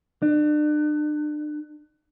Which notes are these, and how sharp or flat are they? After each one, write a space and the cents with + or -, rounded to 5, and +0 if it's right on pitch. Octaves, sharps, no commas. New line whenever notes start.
D4 +35